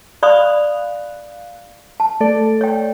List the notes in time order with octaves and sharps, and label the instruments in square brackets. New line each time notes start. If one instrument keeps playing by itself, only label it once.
[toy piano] D5 B5 D#6 [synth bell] F5 F#6
[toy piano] A5
[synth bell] A3 A4 D5
[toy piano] C#5 G5